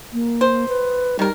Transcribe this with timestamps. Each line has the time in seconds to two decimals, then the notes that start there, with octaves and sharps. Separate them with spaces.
0.13 A#3
0.41 C5
0.68 B4
1.19 D#3 G3 A#4